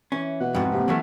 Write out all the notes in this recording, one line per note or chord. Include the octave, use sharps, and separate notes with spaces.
E3 C#4
B2 F#5
F2 G#2 F#4 A4 B4
A2 C3 A#3
E3 F#3 A3 F#4 F5